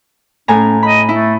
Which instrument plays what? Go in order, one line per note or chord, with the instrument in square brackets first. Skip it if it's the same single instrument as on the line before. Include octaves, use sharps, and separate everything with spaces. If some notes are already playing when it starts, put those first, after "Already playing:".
[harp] A2 G#5 A#5 [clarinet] C#4
[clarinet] D#5 [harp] B5
[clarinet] A3 [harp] E4